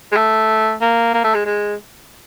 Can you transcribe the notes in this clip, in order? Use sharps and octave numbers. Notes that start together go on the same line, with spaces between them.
G#3
A3
A#3
A#3
A3
G#3
G#3